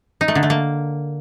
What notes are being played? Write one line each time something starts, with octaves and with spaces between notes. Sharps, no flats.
D#4
A3
D3
A3
A#3